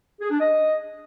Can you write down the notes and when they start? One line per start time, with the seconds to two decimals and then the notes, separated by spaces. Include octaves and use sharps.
0.21 G#4
0.31 D4
0.40 D#5